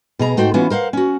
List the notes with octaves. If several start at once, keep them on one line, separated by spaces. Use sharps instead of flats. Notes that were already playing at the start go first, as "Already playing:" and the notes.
B2 G#4 A#5
G#2 A3 F#4 C5 G5
E3 B3 C#4 F4 F#4
A#4 C5 F5 F#5
C#4 F#4